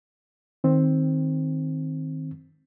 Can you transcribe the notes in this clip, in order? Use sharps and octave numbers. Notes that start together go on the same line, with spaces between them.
D#3 C4